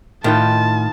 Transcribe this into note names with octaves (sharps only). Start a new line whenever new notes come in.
A2 D#3 F4 B4 A5